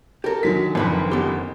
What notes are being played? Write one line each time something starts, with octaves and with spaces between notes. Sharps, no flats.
G4 A4 A#4
F#2 D3 D#3 F#3 B6
F#1 F2 B3 B4 B5
B3 G4